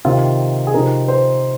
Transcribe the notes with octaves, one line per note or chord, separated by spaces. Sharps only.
C3 D#3 C4 D#4 F4
G#4
C3 F3 C4 D#4 A#4
C5